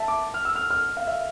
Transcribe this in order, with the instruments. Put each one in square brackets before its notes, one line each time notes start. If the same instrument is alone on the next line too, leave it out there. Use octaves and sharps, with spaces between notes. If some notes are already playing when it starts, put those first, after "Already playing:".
Already playing: [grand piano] E5 A5
D6
F6
E6
F6
F6
F5
E5